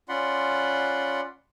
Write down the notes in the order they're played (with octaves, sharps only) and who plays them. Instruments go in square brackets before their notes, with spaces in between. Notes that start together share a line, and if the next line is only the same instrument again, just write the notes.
[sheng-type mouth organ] C#4 F4 D5 F#5 B5 C6